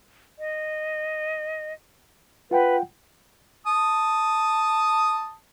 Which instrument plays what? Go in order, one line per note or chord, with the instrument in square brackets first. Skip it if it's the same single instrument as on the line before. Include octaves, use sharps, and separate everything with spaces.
[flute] D#5
[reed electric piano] F4 F#5 G5 [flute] B4
[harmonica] A5 D#6